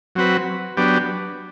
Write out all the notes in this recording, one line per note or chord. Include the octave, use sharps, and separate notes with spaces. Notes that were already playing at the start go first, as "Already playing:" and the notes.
F#3 C4 F#4 B4
F#3 B3 D4 G4